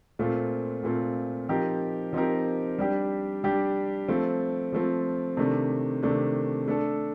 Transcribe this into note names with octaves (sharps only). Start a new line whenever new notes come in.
A#2 A3 C4 F4
A#2 A3 C4 F4
F3 C4 D#4 G4 A#4
F3 C4 D#4 G4 A#4
G3 D4 G4
G3 D4 G4
F3 A3 C4 F4
F3 A3 C4 F4
C3 D#3 A3 D4
C3 D#3 A3 D4
A3 D4 A4